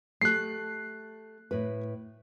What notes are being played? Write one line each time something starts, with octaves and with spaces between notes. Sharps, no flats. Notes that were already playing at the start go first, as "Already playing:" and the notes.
A3 G4 A4 F#6 C7
A2 B4